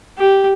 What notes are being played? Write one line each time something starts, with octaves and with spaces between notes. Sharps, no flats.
G4